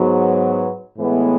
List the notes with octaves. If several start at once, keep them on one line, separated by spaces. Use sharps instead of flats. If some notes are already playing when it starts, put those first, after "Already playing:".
Already playing: G#2 F#3 B3
A2 E3 G#3 B3